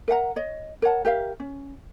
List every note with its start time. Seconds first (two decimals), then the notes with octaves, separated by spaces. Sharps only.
0.08 A#4 E5 F#5 A#5
0.36 C#5 D#5
0.82 A#4 C#5 F#5 A5
1.05 G4 A#4 E5 F5
1.40 C#4